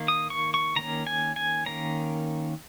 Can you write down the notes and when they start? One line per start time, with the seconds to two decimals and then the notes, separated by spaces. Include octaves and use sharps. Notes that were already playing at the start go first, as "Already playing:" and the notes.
Already playing: D#3 A#3
0.08 D#6
0.30 C#6
0.54 C#6
0.76 D#3 A#3 C#4 A#5
1.07 G#5
1.36 G#5
1.66 D#3 A#3 C#4 A#5